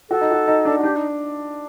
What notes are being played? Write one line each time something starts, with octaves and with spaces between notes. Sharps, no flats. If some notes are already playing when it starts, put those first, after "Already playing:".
F#4 A4
D#4
F#4
D#4
D4
F#4
D4 G4
D#4